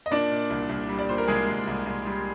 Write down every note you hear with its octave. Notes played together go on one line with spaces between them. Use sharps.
D#5
A#2 D4 D5
A#2
C2
C2
G3
D5
A#2 C5
A#4
C2 G#3 G#4
C2
C2
C2
G3